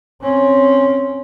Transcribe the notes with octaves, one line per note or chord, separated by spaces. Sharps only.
C4 C#4